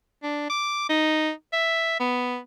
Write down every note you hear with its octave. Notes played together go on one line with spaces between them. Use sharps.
D4
D6
D#4
E5
B3